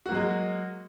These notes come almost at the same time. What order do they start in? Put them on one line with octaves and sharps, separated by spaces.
F#4 A#3 F#3 G#3